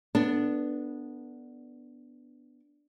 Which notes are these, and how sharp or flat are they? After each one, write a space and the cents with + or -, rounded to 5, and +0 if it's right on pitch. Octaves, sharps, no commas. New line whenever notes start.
B3 +0 D4 +0 A4 +30